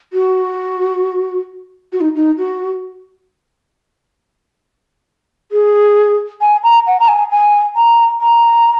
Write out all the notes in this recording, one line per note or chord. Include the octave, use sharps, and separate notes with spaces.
F#4
F#4
D#4
D#4
F#4
G#4
G#5
A#5
F#5
A#5
G#5
G#5
A#5
A#5